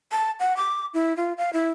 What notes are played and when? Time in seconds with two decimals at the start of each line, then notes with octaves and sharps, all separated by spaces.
0.12 A5
0.40 F#5
0.57 D6
0.94 E4
1.17 F4
1.38 F5
1.53 E4